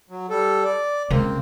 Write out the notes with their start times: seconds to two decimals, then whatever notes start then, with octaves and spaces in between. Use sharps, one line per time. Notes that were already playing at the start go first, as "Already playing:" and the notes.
0.10 F#3
0.30 G3 A4
0.64 D5
1.10 C#2 A#3 C4